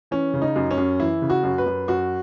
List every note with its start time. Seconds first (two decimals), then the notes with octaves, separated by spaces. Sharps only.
0.11 E3 C#4
0.34 C#3
0.42 D#4
0.56 F#2
0.71 C#4
0.78 F#2
1.00 E3 E4
1.22 C#3
1.30 F#4
1.43 F#2
1.58 B4
1.66 F#2
1.88 F#2 F#4